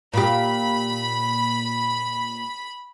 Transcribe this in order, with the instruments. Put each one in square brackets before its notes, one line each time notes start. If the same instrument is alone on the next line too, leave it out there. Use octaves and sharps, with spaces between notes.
[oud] A#2 G4 [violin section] B5